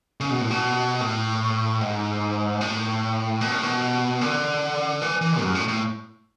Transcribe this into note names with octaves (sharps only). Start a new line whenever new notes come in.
C#3
B2
A2
B2
A2
G#2
A2
B2
A2
B2
D3
E3
E3
F#2
A2
A2